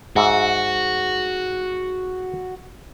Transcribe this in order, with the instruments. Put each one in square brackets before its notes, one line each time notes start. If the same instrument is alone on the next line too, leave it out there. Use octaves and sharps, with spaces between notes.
[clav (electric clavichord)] G#2 E5 [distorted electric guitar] F#4